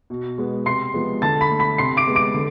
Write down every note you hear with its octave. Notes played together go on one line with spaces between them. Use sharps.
B2
G#3 B3
C3 C6 C7
F3 G#3 B3
D3 A5 A6
B5 B6
A3
B5 B6
C3 C6 C7
D6 D7
G#3 B3
D6 D7
D3